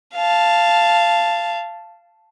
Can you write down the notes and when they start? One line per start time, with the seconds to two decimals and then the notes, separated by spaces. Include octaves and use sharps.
0.15 F5 A5